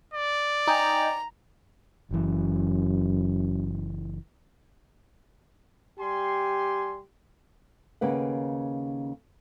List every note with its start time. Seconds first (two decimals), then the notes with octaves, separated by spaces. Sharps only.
0.14 D5
0.67 D#4 G5 G#5 A#5
2.11 F#1 F#2 E3
6.00 G3 G4 G#5 C6
8.01 D#2 C#3 A#3 B4 F#5